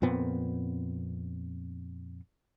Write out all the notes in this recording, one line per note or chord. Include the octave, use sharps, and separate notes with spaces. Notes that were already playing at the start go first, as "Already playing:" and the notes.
F2 A#2 B3 C4